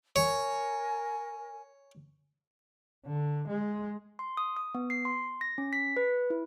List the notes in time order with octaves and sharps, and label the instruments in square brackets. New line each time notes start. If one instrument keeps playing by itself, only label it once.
[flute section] A#4 G#5 [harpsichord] C#5
[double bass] D3
G#3
[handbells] C6
D#6
D#6
B3
C7
C6
A#6
C#4
B6
B4
E4